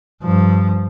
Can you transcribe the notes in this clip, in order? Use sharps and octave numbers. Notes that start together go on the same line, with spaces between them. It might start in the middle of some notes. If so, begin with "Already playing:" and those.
G2 F3